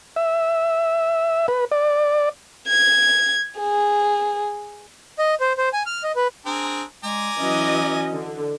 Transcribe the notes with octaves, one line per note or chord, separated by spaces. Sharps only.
E5
B4
D5
G#6
G#4
D#5
C5
C5
G#5
F6
D#5
B4
C4 D4 G#4 A#4
G#3 D5 G#5 A#5
E3 F#3 C#4 D#5
D3